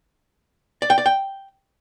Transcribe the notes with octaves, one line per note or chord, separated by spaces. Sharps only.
D5
G5
D5
G5